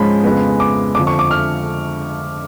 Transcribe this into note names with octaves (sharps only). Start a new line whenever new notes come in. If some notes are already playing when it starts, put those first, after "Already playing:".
Already playing: G#2 F3 G#3 C#4 B5
F2 C#3 G#3 B3
D6
F2 D3 F3 D6
C#6
D6
F6